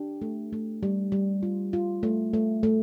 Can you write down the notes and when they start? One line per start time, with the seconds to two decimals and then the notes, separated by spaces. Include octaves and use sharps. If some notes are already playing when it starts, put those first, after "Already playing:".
Already playing: D4 G4
0.22 A3
0.53 A3
0.83 G3
1.12 G3
1.43 F4
1.73 F4
2.03 A3
2.33 A3
2.63 A3